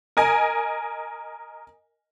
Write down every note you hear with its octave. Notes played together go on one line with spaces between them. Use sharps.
A#4 D#5 G#5